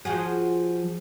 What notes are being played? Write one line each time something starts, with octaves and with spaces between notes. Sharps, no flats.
F3 F#4 G#4